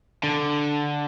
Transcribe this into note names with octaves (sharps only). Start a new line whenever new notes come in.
D3